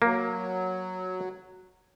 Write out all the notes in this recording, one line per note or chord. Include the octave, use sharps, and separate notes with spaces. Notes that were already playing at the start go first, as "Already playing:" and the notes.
F#3 A#3